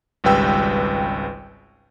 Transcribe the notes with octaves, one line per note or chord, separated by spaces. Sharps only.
G#1 C#2 G3 B4 G5 E6